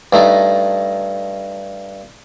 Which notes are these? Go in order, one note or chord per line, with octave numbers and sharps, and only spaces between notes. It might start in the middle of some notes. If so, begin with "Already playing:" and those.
G2 A3 D#4